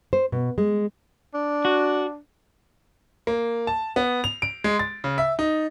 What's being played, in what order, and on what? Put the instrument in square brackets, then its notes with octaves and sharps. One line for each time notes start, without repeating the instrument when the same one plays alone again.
[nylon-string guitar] C5
B2
G#3
[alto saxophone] D4
[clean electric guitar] F#4
[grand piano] A#3
A5
B3
F7
D7
G#3
A6
C#3
E5
D#4